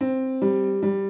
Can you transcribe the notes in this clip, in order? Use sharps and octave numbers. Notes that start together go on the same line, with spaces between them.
C4
G3
G3